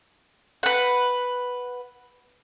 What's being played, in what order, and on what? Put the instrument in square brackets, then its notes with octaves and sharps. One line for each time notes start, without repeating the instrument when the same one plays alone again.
[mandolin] B4 F#5